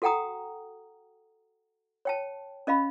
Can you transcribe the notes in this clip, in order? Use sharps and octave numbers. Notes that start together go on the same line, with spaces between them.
F#4 A4 F#5 G5 A#5 D#6
C#5 G5 A5
C#4 D#5 F5 B5